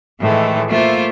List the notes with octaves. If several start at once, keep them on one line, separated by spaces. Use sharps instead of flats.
A2 D#3 E3 G#3 A3
A3 A#3 F4 C5 E5